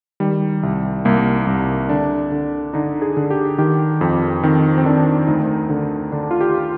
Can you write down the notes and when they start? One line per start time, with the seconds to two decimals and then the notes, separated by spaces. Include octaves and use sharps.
0.20 D#3 G3
0.63 C2
1.05 C2 A#3
1.47 C2
1.89 D3 D4
2.32 D3
2.73 D3 D#4
3.02 G#4
3.17 D3
3.30 G4
3.58 D#3 G4
4.01 F2
4.43 D#3 C4
4.78 C4
4.85 D#3 D4
5.27 D2 D#4
5.70 D3
6.12 D3 D4
6.31 F4
6.41 G4